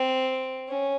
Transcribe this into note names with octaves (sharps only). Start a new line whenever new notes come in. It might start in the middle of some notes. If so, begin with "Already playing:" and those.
Already playing: C4
C#4